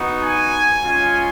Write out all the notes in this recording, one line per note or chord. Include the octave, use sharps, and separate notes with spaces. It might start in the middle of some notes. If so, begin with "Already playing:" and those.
Already playing: B3 D#4 F#4
G#5
G#3 C#4 F4